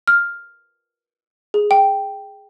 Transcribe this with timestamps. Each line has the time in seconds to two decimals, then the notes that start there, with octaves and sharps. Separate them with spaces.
0.07 F6
1.54 G#4
1.71 G5